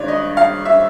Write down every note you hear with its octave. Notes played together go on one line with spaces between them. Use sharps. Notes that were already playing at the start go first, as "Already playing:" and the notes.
Already playing: G2 D#3 G#3 C#5 D5
D#5
F5
E5